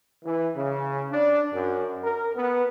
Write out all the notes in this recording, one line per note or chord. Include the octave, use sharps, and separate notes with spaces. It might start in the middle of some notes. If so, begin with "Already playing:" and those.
E3
C#3
D4
F#2
A#4
B3